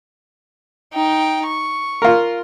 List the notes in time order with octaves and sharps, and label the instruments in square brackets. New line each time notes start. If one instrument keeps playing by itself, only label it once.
[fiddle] D#4 G5
C#6
[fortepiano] F4 A#4